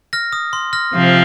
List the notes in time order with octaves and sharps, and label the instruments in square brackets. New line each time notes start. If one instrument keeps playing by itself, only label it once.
[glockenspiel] F6 A#6
D#6
C6
F6 A#6
[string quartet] C3 F3